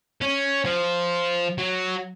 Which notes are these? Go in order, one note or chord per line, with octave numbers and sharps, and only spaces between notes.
C#4
F3
F#3